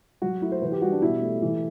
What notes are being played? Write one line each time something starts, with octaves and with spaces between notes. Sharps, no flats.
F#3 F#4
A3 E4
C5
E3 B4
G4
G3 F#4
D4
B2 E4
A3
E3